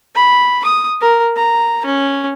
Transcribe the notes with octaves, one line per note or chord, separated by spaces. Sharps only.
B5
D#6
A#4
A#5
C#4